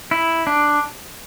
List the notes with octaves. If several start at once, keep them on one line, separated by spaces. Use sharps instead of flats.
E4
D4